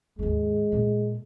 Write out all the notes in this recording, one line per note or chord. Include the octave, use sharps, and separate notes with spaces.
D#2 G#2 G#3
A#2 A3